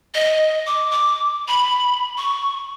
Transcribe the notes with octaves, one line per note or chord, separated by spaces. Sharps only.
D#5
D6
D6
B5
C#6